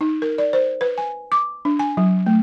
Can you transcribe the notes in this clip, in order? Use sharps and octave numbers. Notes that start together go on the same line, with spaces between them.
D#4
A#4
D5
C5
B4
G#5
D6
D4
G#5
F#3
A3